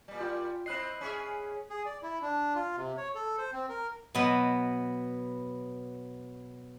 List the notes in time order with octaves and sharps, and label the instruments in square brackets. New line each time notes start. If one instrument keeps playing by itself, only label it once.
[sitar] A#2 G3
[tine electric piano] F4 G5
[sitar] C4 E4 D#5 [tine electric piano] B5 F#6 C7
[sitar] C#4 G#4 E5
[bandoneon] G#4
D5
E4
D4
F4
C3
C#5
A4
C5
C4
A#4
[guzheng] B2 F#3 B3